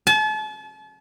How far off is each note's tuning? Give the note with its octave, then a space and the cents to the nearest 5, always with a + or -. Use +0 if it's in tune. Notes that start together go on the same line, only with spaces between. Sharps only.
A5 -40